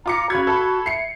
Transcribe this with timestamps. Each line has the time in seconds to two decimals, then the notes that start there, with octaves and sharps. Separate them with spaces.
0.06 F4 A#5 D6 C#7
0.30 C#3 F#4 B5 G#6
0.47 A4 B5
0.86 E5 C7 C#7